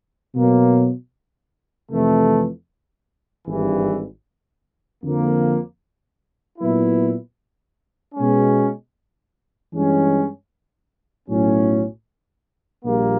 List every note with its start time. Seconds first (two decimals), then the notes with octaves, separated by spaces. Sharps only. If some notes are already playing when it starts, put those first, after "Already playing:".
0.34 B2 F#3 A#3
1.90 F2 C3 E3 A3
3.47 G#1 G2 E3
5.02 F2 D3 F3 A#3
6.59 A#2 F#3 B3 E4
8.15 B2 G#3 C#4
9.71 G2 E3 G#3 C#4
11.28 B1 A2 F#3 A3 C#4
12.84 A#1 A#2 G3 A#3